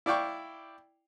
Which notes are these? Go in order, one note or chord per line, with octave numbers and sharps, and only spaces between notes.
E4 D5 F5 G5 C#6